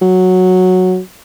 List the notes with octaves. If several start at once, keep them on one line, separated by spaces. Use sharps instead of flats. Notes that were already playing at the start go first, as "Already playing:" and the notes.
F#3